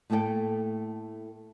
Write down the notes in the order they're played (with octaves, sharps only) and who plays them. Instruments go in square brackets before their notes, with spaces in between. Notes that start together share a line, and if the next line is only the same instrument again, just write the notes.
[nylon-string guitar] A2 A3 A#3 G4 A4 G5